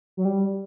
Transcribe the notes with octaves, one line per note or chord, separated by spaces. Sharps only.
F#3
G3